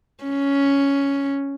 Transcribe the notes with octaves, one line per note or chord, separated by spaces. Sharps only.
C#4